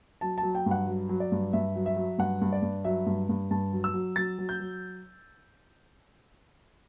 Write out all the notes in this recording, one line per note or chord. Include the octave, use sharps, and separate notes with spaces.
F#3 A5
A5
F#3
G5
G2
F#5
F#3
F#3
D5
G2
G2 E5
F#3
E5
F#3
G2 F#5
G2
D5
G2
F#3 E5
G2
G2
G2 A5
F#3
E6
F#3
F#3 A6
F#3
G6
F#3